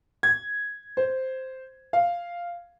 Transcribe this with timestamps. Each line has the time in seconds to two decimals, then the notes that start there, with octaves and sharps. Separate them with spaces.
0.23 G#6
0.97 C5
1.93 F5